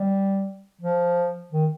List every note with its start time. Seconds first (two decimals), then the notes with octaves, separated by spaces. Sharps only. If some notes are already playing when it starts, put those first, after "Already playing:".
Already playing: G3
0.81 F3
1.53 D#3